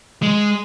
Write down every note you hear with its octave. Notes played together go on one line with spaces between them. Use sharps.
G#3